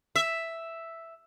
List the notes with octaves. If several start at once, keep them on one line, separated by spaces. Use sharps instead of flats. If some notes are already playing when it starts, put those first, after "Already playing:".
E5